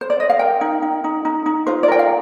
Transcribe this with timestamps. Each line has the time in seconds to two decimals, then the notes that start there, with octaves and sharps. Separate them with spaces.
0.01 C5
0.10 D5
0.20 D#5
0.30 F5
0.39 A#4 G5
0.61 D#4
0.82 D#4
1.04 D#4
1.25 D#4
1.46 D#4
1.67 F4 C5
1.83 D5
1.88 A#4 G5
1.99 F5